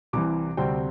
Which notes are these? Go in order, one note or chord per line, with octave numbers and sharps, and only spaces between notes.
C2 C3 E3 D6
D2 C3 G3 C4 G5